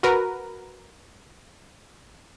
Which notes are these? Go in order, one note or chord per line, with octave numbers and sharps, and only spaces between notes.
F#4 A#4 B4